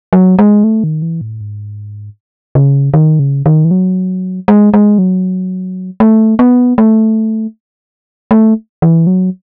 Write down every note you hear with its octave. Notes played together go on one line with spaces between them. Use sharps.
F#3
G#3
A3
D#3
E3
A2
G#2
C#3
D#3
C#3
D#3
E3
F#3
G#3
G#3
F#3
A3
B3
A3
A3
E3
F#3